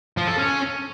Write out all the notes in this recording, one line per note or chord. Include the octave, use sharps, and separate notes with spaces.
F3
A4
C#4